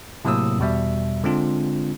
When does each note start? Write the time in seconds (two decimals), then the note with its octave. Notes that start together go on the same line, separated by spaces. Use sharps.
0.25 A2 C3 F#3 A#3 D#6 E6
0.59 E2 B2 G3 E5
1.24 D3 G#3 C4 D4 F4